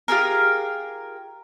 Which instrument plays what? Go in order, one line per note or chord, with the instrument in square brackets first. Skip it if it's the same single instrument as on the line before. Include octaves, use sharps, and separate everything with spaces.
[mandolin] F4 G4 G#4 A#4